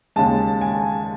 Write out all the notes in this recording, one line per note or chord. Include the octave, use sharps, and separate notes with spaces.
D#2 C#3 G#3 A5
G#5